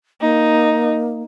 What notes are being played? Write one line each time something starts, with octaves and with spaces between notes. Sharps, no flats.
A#3 D#4